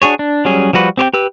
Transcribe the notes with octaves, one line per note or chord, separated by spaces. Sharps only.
D4 F#4 G#4 C#5
D4
F#3 G3 C#4 G#4
F3 G3 F#4 B4
C4 G4 C5 G5
G4 B4 E6